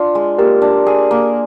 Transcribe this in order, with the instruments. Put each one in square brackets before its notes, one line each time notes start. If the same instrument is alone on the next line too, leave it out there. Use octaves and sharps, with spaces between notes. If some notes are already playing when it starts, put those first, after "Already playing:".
Already playing: [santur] D4 F4
G#3
[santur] A#3 [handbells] G4 A#4
[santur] D4
G#4
A#3